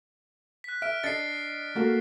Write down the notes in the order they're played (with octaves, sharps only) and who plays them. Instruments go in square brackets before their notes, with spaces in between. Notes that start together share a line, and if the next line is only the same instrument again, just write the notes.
[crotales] F#6 B6
[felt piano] E5 [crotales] F6 D7
[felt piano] D4 D#5 C#7 [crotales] A6 C7
[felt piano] A3 A#3 F#4